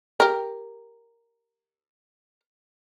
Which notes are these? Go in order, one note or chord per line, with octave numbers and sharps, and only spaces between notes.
G4 A#4